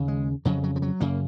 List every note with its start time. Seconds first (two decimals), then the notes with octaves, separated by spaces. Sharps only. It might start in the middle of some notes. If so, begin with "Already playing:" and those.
Already playing: D#2 C#3
0.08 G#3
0.45 F2 C#3 F#3
0.64 F#3
0.76 F3
0.82 F#3
1.00 F#2 C#3 A#3